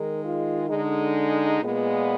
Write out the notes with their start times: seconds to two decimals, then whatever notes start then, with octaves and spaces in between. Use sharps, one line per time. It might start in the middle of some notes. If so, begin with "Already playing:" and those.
Already playing: D#3 G#3 A#4
0.23 F4
0.69 D3 G#3 D#4
1.62 A#2 G#3 B3